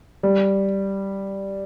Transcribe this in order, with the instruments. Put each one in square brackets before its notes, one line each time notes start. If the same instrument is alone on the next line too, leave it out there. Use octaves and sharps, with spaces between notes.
[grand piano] G3